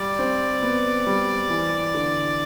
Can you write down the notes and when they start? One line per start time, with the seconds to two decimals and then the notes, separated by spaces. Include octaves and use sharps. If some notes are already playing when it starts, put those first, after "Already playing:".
Already playing: G3 D5
0.19 C4
0.62 B3
1.07 G3
1.50 E3
1.94 D3